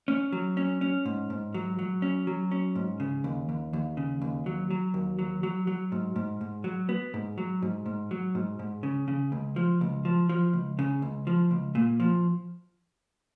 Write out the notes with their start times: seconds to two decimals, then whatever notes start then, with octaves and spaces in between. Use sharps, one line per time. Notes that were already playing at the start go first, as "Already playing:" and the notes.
0.08 C#4
0.32 F#3
0.57 C#4
0.81 C#4
1.06 G#2
1.30 G#2
1.54 F#3
1.79 F#3
2.02 C#4
2.27 F#3
2.51 C#4
2.75 G#2
3.00 C#3
3.24 D#2
3.49 D#2
3.73 D#2
3.97 C#3
4.22 D#2
4.46 F#3
4.70 F#3
4.94 D#2
5.19 F#3
5.43 F#3
5.67 F#3
5.92 G#2
6.16 G#2
6.41 G#2
6.64 F#3
6.89 B3
7.14 G#2
7.38 F#3
7.62 G#2
7.86 G#2
8.11 F#3
8.35 G#2
8.59 G#2
8.83 C#3
9.08 C#3
9.32 C#2
9.56 F3
9.81 C#2
10.05 F3
10.29 F3
10.53 C#2
10.79 C#3
11.02 C#2
11.27 F3
11.51 C#2
11.75 A#2
12.00 F3